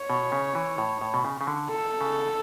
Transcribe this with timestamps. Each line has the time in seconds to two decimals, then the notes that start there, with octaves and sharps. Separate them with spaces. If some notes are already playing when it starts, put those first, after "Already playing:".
Already playing: C#5
0.10 B2
0.32 C#3
0.55 E3
0.78 A2
1.01 A2
1.14 B2
1.25 C#3
1.41 C#3
1.47 D3
1.70 A4
2.01 C#3